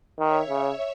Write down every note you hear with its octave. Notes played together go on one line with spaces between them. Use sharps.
D#3 C#5 E5
C#3 C#5 E5